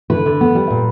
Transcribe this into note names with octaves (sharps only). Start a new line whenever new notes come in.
D3 B4
D3
B3
G3
A#2